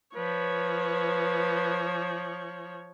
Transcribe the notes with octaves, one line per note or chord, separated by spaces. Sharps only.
F3 B4 C#5